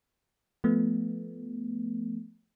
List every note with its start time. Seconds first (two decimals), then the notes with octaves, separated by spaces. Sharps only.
0.64 F3 A3 B3